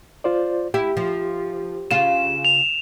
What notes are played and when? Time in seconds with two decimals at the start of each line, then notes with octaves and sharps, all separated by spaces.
0.24 F4 C5 D5
0.74 E4 G4
0.97 F3
1.91 C#3 F4 E7
2.45 F7